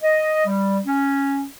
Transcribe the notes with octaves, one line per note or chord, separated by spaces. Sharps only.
D#5
G3
C#4